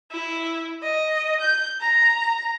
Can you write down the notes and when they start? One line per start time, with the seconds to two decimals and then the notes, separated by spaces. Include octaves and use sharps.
0.11 E4
0.82 D#5
1.40 G6
1.80 A#5